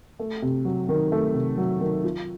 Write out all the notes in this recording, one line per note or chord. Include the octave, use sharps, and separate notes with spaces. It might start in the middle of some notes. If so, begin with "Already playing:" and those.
A3
C3
F#3
D#3
A3
C3
F#3
D#3
F4